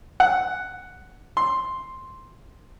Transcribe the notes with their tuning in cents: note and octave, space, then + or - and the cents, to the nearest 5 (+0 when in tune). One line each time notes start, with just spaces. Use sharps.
F#5 +5
C6 +5